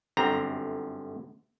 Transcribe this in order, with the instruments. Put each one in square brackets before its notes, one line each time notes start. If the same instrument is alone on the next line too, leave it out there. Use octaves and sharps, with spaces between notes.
[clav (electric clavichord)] G1 F#2 D3 C4 A#5